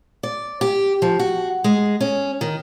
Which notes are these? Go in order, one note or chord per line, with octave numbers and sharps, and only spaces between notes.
D5
G4
F3
F#4
G#3
C#4
D#3